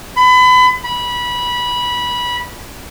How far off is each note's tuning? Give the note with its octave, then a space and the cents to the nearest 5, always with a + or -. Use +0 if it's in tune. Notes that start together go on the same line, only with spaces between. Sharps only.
B5 +30
B5 -20